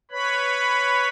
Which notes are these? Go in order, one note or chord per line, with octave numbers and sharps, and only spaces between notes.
B4 C#5 B5